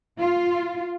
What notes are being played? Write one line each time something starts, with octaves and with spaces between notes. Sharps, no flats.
F4